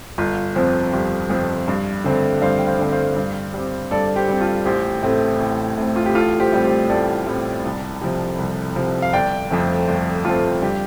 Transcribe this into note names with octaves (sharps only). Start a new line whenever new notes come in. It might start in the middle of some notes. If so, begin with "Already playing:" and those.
G1 F4
F2 F3 C4
G1 G4
F2 F3 C4
G2
D3 A3 C4
G2 C5 F5
G5
C5 F5
D3 A3 C4
C5 F5
G2
G3 C4
G2 A4 D5
D5
G4 C5
G3 C4
F4 A4
A1 G4 C5
A2 A3 C4
A1
A2 A3 C4
F4
G4
A1 F4 A4
G4 C5
A2 G3 C4
G4 C5
A1 A4 D5
A2 G3 C4
C2
C3 F3
C2
C3 F3
F5
G1 D5 G5
F2 F3 A3 C4
G1
F2 F3 A3 C4 F4 A4
G2 G4